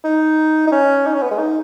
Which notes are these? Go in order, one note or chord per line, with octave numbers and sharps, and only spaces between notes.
D#4
D#4
C#4
D#4
C#4
B3
G#3
D#4